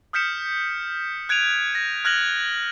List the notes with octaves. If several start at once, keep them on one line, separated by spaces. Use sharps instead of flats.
D#6 F6 G6 B6 C#7 E7
F#6 G#6 D7 D#7 F7
A#6
F6 F#6 G#6 A#6 F#7